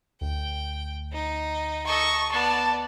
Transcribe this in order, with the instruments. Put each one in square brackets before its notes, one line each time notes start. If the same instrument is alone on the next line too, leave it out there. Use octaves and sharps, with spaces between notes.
[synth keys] D2 [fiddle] G5
[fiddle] D#4
[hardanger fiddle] A4 D#5 [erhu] C#6
[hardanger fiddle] B3 [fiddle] D5 [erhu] A5